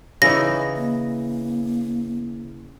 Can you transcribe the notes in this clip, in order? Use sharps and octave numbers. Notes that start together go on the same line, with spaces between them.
C#3 E3 D#4 A#6
A#3